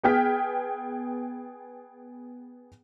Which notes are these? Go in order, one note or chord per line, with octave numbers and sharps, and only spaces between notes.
B3 G#4 G5 F6 B6